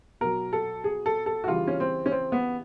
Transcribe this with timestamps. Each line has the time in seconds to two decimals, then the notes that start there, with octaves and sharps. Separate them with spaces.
0.21 B2 F#3 A#4
0.53 A4
0.84 G#4
1.06 A4
1.26 A4
1.44 F#4
1.48 C#3 E3 G3 F4
1.68 C#4
1.80 C4
2.06 C#4
2.12 C4
2.32 B3